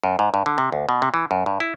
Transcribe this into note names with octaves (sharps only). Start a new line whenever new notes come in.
F#2
G#2
G2
D3
C3
D2
B2
C3
E3
F#2
G2
E4